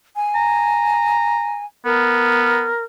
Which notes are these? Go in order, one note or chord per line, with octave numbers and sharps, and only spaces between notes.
G#5
A#5
B3 A#4